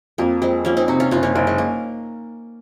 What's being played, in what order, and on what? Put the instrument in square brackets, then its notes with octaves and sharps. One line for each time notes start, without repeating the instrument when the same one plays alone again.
[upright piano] F2 [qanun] A#3
[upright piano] F2 [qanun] G#3 C4
[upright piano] F3 [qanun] A#3 C#4
[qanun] C4 D#4
[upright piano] C3 [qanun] D#4 F#4
[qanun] C#4 F4
[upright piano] F#1 [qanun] C#4 F4
[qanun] A#3 C#4
[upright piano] F#1 [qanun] A#3
[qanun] G#3
A#3